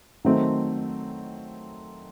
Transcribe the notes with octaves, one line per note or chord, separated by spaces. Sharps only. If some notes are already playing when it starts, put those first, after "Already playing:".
D#3 F#3 A3 C4